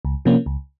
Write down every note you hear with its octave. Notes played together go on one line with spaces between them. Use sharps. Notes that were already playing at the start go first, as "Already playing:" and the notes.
C#2
C3 F3 A#3 C#4
C#2